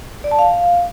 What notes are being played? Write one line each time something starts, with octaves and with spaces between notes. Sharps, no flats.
D5
A5
F5